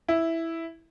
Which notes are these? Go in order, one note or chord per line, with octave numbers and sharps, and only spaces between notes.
E4